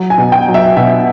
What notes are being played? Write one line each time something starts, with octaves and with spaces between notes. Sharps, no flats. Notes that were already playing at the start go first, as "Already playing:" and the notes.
Already playing: F#3
G#5
B2
G5
F#3
E5
B2 E5